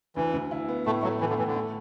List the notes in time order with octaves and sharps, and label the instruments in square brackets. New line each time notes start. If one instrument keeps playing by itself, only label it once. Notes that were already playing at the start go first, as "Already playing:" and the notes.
[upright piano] D2 [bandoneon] E3
[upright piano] D2
E4
B3
[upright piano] A2 [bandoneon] A3
[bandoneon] F#3 [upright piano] A3
[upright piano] A2 [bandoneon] E3
[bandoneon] D3
[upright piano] A2 [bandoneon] E3
[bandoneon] D3
[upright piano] A3